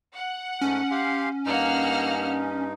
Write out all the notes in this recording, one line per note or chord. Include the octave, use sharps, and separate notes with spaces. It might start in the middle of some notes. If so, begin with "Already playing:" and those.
F#5
G#2 A3 C#4
G4 F5 C6
G2 A#3 D#4 F#5 F6